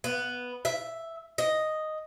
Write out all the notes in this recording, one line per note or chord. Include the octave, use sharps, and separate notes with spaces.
B3
E5
D#5